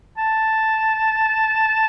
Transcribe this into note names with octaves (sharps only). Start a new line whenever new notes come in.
A5